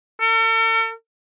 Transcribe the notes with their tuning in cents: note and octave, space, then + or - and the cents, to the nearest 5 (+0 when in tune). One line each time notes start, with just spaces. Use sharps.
A4 +45